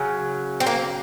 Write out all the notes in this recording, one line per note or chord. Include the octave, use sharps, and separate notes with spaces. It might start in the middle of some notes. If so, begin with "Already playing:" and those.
Already playing: C#3 F#3
C4
A#3